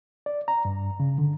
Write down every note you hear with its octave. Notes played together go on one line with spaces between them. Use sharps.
D5
A#5
G2
C#3
D3